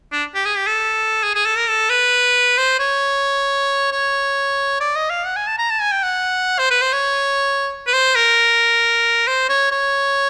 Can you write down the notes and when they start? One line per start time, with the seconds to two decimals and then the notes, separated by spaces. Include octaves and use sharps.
0.12 D4
0.35 G4
0.45 G#4
0.57 G4
0.67 A4
1.23 G#4
1.35 G#4
1.45 A4
1.57 A#4
1.68 A4
1.90 B4
2.58 C5
2.79 C#5
3.92 C#5
4.80 D5
4.96 D#5
5.10 F5
5.26 F#5
5.36 G#5
5.47 A5
5.58 A#5
5.70 A5
5.81 G#5
5.92 G5
6.03 F#5
6.59 C5
6.70 B4
6.81 C5
6.93 C#5
7.87 B4
7.93 C5
8.15 A#4
9.27 C5
9.49 C#5
9.72 C#5